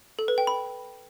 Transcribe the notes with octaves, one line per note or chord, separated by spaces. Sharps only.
A4
B4
G5
B5